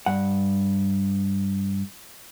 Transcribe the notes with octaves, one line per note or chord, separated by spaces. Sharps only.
G2 F#5